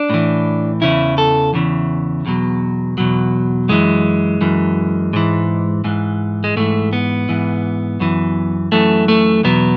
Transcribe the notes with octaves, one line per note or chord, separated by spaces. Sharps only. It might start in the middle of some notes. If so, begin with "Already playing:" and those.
Already playing: D4
A2 E3
E2 C#3 E3 E4
A4
E2 C#3 E3
E2 B2 F#3
E2 B2 F#3
F#2 E3 G#3
F#2 E3
G#2 E3
G#2 E3
G#3
G#2 E3 A3
B3
G#2 E3
F#2 E3
F#2 E3 A3
A3
E2 B2 F#3 B3